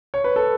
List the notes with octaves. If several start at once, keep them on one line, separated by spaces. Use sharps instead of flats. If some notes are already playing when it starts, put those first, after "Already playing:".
C#5
B4
A4